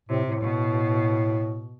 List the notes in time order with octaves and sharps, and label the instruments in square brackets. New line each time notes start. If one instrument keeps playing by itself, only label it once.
[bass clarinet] A2 [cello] C3
[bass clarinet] A2
[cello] B2